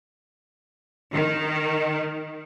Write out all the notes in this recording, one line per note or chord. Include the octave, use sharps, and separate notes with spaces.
D#3